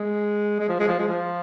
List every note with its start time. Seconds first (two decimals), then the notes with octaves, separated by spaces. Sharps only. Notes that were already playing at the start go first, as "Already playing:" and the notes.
Already playing: G#3
0.60 G#3
0.69 F3
0.79 G#3
0.88 F3
0.99 G#3
1.08 F3